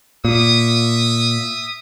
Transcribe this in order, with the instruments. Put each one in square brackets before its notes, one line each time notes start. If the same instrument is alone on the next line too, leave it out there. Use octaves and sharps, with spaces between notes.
[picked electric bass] A#2 [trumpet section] E5 D#6